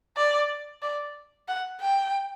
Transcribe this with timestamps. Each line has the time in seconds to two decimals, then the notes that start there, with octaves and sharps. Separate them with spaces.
0.17 D5
0.82 D5
1.48 F#5
1.81 G5